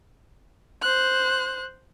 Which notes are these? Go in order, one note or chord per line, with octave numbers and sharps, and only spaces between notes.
C5 F#6